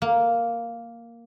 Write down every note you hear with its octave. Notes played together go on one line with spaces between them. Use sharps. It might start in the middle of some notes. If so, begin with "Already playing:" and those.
A#3